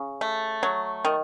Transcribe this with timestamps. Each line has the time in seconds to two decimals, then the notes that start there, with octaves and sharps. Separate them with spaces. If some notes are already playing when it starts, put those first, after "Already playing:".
Already playing: C#3
0.21 A3
0.63 F#3
1.05 D#3